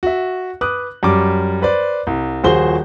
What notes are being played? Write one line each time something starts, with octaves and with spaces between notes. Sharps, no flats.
F#4 E5
B4 D6 D#6 F#6
F#2 G3 D6
B4 C5 D5
C2
D#1 F3 F#4 G#4 C5 G7